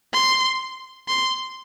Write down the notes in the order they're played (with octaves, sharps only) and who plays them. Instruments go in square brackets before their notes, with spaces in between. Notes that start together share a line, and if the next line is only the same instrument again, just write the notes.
[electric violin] C6
C6